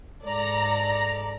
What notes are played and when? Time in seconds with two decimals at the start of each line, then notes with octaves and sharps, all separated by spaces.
0.25 G#2 A4 D5 A#5